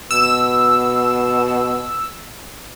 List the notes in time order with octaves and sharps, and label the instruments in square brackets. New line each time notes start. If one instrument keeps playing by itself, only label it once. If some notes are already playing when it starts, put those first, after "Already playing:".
[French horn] B2 [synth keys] E6